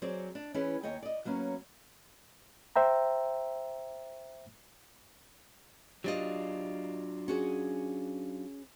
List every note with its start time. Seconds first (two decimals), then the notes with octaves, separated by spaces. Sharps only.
0.02 F#3 C4 G#4 C5 D5
0.35 D4
0.54 E3 C#4 E4 G#4 B4
0.83 D#2 C#5 D#5 G5 G#5
1.03 D5 D#5
1.25 F#3 A#3 B3 C#4
2.76 C5 E5 G5 A#5
6.04 F#3 D4 F4 G4 D5 D#5
7.28 C#4 F#4 G#4